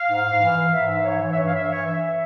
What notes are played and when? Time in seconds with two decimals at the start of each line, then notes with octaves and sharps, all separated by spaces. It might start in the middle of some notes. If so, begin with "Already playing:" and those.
Already playing: F5
0.10 G#2
0.26 G#2
0.42 E3
0.57 E3
0.73 G#2 E5
0.90 G#2
1.05 E3 C#5
1.21 E3
1.32 E5
1.37 G2 C#5
1.48 F5
1.53 G2 E5
1.69 E3 C#5
1.86 E3 E5
2.03 E5